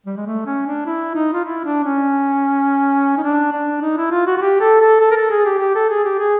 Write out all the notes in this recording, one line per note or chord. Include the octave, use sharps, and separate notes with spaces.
G3
G#3
A3
C#4
D4
E4
D#4
F4
E4
D4
C#4
D#4
D4
D4
D#4
E4
F4
F#4
F#4
G4
A4
A4
A4
A#4
A4
G#4
G4
G4
A4
G#4
G4
G#4